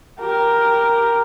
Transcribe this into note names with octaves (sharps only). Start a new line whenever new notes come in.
G4 A#4